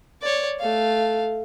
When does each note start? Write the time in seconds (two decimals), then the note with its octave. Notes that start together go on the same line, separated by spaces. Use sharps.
0.22 C#5 D5
0.60 A3 F5